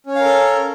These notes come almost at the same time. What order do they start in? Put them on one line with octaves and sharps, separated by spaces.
C#4 C#5 F5 A#4 A4